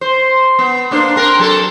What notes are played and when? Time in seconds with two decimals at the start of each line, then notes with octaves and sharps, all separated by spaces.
0.01 C5
0.59 B3
0.91 A#3 D4 C5
1.16 C4 A#4
1.39 F#3 A4